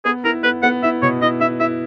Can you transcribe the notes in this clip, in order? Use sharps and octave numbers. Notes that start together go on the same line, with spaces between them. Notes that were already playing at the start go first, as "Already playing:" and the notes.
B3 G#4
E4 A#4
B3 B4
B3 F#5
E4 E5
B2 C#5
E4 D#5
E4 E5
E4 E5